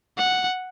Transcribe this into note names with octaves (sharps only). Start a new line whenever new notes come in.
F#5